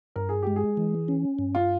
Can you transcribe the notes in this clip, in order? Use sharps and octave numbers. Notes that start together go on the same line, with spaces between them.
G2 A#4
G#4
G#3 G4
G#4
E3
C#4
G2
F4